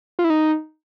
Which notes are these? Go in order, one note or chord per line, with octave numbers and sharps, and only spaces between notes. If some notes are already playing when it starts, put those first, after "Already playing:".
F4
E4
D#4